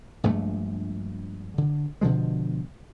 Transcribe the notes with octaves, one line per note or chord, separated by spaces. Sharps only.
A#1 G2 G#3 A3
D3
B2 D3 F3 G#3